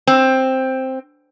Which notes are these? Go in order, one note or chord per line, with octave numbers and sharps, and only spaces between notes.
C4